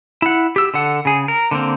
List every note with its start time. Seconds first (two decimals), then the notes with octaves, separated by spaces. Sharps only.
0.22 E4 F#5
0.56 G4 E6
0.74 D3 A4 F#5
1.05 C#3 G#4
1.28 A#4
1.51 D3 A#3 C4